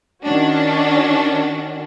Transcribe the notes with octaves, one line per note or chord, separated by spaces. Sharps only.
D#3 C#4 D4 F#4